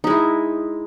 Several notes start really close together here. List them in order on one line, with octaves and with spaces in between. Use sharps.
D#4 G#3 E4